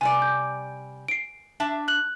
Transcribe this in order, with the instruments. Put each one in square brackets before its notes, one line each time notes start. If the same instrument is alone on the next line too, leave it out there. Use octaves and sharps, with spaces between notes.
[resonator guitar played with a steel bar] C3 G3 D5 [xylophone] G#5
[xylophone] G6
C7 D7
[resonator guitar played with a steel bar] D4 E5 A5
[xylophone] F#6 F#7